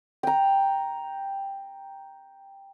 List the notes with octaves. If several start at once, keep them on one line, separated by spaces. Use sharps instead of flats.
G5 A#5